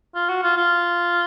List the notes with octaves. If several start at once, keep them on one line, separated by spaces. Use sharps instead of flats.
F4
F#4
F4
F4